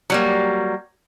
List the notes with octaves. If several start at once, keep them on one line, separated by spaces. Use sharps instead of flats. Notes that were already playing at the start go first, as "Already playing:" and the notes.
F#3 G3 A#3